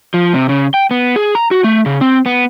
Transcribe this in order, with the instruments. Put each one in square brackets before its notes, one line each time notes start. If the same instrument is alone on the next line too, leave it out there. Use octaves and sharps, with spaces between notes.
[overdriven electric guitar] F3
C3
C#3
G5
B3
G#4
A#5
F#4
A3
C#3
C4
B3